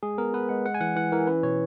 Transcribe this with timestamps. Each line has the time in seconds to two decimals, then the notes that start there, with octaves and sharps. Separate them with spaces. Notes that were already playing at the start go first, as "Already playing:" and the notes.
0.03 G#3 G#4
0.18 B3 A#4
0.34 B3 B4
0.49 G#3 F#5
0.65 G#3 F#5
0.74 G#5
0.81 E3 F#5
0.96 E3 F#5
1.12 E3 A#4
1.27 C#4 B4
1.43 B2 C#5